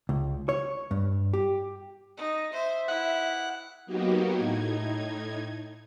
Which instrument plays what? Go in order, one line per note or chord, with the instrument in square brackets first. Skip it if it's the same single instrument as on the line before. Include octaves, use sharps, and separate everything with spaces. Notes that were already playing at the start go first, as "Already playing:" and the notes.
[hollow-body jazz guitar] C#2
C#5
G2
G4
[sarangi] D#4
[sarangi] C5 [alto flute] E5
[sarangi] E4 [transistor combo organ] F#5
[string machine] F#3 A#3 B3 D#4 F#4 G4
A2 D#4 G#6